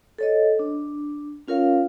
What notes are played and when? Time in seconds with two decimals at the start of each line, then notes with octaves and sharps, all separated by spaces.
0.18 A4 C#5 D#5
0.59 D4
1.48 C#4 F4 A#4 C#5 F5